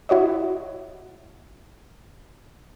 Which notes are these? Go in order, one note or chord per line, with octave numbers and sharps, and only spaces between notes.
E4 F#4 C#5 D#5